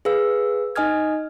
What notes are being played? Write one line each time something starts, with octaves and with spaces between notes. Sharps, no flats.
G#4 B4 F5 E6
D#4 D#5 G#5 D#6 F6 G#6